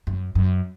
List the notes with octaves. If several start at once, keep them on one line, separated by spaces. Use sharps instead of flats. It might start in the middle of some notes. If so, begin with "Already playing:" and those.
F#2
F#2